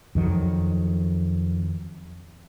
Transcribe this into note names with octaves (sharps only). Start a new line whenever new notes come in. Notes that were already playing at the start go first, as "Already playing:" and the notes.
F2 D#3 F#3